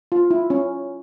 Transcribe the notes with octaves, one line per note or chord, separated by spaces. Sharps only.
F4
E4
C#4